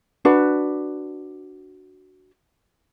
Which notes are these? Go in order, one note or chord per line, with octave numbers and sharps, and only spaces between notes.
D4 F#4 B4